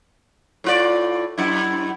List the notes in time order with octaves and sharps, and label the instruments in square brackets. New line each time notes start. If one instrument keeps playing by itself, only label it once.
[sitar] A2 F4 D5
F#2 E4